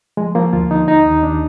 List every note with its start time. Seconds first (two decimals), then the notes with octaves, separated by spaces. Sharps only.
0.17 F3 G#3
0.35 F3 A#3
0.53 D2 F4
0.70 D3 D#4
0.88 D#2 D#4
1.05 D#2
1.23 D#2 D4